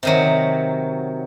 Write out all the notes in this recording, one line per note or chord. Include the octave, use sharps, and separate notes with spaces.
C3 D#3 F#3